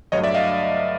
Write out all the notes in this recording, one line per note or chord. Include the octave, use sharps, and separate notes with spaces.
G2 D3 F#3 A3 C#5 D#5
D5 E5
D#5 F5